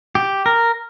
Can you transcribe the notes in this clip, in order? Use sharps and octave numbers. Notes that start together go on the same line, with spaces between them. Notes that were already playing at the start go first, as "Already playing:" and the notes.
G4
A#4